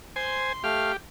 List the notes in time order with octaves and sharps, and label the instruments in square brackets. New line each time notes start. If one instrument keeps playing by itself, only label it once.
[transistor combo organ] C5 G#5 [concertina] C6
[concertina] A3 F5 F6 [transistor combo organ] G4